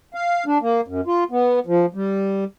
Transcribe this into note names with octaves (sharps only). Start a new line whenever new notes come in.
F5
D4
A#3
F#2
F4
B3
F3
G3